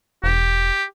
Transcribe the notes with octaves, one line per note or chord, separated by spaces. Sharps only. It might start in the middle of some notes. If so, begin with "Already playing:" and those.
E1 G4